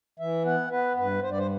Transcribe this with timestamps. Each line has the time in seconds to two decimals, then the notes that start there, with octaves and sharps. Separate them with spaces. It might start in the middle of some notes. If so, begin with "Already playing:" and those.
0.19 E3 E5
0.45 B3 F#5
0.70 B3 B4
0.97 G2 B4
1.22 G2 C5
1.31 D5
1.37 C5